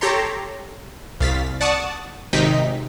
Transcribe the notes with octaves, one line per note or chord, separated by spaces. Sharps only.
G4 A4 C#5 A#5 C6
C2 F5 A6 B6
D5 F#5 A5 C#6 D#6
G#1 C3 D#4 G5 B6